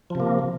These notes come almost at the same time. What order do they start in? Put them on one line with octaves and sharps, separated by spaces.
F3 C3 A#3